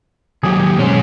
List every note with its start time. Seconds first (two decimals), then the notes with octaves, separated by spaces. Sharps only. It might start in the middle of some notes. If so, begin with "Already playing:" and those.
0.43 D#2 F#3 G4 G#4
0.79 B1 G#3 C#4 C5